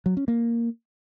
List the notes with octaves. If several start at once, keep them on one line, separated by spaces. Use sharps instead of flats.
F#3
C#4
A#3